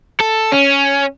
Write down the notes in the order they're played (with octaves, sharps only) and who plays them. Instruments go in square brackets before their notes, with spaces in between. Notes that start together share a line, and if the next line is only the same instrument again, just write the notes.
[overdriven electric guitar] A4
C#4